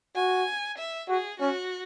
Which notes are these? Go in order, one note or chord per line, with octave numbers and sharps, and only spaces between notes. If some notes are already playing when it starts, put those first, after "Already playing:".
F#4 G#5
E5
F#4 G#4
C#4 F#4